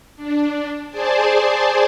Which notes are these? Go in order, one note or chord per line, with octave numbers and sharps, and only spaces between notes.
D4
G#4 C5 D5 G#5 A5